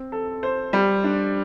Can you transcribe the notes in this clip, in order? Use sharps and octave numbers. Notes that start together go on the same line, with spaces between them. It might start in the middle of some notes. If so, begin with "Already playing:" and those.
Already playing: C4
A4
C5
G3
D4